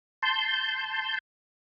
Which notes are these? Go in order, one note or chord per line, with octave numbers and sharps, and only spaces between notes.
A5 C6 G6